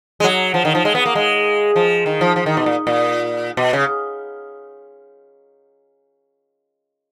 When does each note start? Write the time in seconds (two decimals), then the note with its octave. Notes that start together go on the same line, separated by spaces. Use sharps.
0.20 G#3
0.24 F#3
0.54 F3
0.65 D#3
0.75 F3
0.85 G#3
0.95 B3
1.06 A#3
1.15 G#3
1.76 F3
2.06 D#3
2.21 F3
2.36 F3
2.46 D#3
2.57 B2
2.66 A#2
2.87 A#2
3.57 B2
3.73 C#3